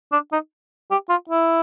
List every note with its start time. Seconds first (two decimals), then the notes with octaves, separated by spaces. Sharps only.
0.12 D4
0.32 D#4
0.91 G4
1.10 F4
1.29 E4